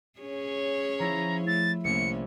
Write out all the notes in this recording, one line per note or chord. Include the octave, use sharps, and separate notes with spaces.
C#4 G#4 C#5
F3 E4 A#5
A3 E4 A6
C2 A3 A#3 C#4 C#7